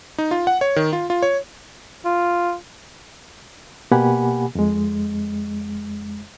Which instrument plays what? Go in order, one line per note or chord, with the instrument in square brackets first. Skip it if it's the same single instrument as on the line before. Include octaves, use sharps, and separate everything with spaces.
[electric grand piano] D#4
F4
F#5
C#5
D#3
F4
F4
C#5
[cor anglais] F4
[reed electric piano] B2 A#3 G4 F#5 G#5 B5
F2 G#3